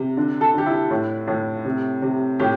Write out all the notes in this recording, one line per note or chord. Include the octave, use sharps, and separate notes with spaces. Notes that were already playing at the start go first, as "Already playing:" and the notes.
Already playing: C3
D3
A4
D3 G4
E4
A2
A2
C3
C3
A2 G4